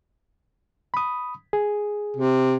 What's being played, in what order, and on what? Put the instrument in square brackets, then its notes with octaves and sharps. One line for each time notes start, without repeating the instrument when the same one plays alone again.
[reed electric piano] B5 D#6
G#4
[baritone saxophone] C3